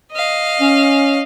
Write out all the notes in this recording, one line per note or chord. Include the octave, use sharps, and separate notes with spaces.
D#5 F5
C#4